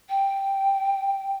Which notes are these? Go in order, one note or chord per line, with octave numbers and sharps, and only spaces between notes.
G5